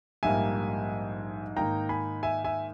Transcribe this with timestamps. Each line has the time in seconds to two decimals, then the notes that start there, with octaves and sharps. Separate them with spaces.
0.23 A#1 G#2 G3 A#3 E5 G#5
1.56 G#2 D#3 A#3 D#4 G5 A#5
1.89 G#5 B5
2.23 E5 G#5
2.44 E5 G#5